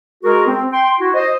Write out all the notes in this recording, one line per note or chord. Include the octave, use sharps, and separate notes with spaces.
G#3 F#4 G#4 A#4
C4
G5 C6
E4 F#4
C5 D#5